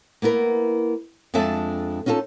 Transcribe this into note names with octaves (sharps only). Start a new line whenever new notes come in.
A#3 B3 E4 A#4
F2 G#3 D4 A4 E5
C#4 D#4 F4 G#4 A4